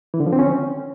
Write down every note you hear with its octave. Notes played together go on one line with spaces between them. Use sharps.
E3
D3
F3
C4
C#4